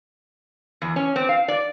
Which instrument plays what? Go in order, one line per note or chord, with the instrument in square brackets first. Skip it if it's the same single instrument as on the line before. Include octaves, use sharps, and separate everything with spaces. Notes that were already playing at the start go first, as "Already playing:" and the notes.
[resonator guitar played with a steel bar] E2
C#4
C4
F5
D5